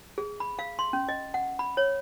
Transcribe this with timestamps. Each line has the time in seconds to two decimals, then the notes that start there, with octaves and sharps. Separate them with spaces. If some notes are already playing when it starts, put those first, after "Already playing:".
0.18 G#4
0.40 B5
0.59 F5
0.79 C6
0.93 C#4
1.09 D#5
1.34 F#5
1.59 B5
1.77 C#5